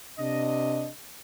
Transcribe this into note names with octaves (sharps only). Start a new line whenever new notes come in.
C3 D4 D#5